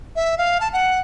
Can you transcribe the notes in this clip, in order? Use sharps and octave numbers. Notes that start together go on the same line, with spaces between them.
E5
F5
A5
F#5